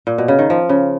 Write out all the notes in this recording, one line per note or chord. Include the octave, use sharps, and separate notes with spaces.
A#2
B2
C#3
D#3
F3
C#3